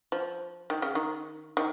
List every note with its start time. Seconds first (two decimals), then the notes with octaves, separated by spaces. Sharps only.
0.12 F3
0.70 D#3
0.82 C#3
0.95 D#3
1.57 D#3